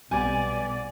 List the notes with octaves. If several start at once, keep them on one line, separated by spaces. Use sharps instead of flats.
B1 G3 B3 D5 G#5